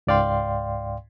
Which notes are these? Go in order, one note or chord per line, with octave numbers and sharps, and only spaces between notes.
C#2 G#2 D5 F5 G5 C6